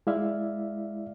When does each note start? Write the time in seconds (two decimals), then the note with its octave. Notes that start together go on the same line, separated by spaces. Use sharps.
0.07 G#3 E4 D5 E5 F5